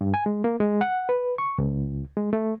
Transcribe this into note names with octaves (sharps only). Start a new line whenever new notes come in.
G2
G#5
G#3
A#3
G#3
F#5
B4
C#6
C#2
G#3
A3